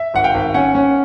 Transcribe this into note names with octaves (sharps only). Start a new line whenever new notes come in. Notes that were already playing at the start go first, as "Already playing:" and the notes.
Already playing: E5
G#1 F#5
F5 G5
G#1
C#4 F#5 G#5
C#4